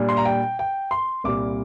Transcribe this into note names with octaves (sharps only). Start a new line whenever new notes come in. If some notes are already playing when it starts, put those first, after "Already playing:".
Already playing: A#2 G3 D4
C6
A#5
G5
G5
C6
C2 A#2 G3 D6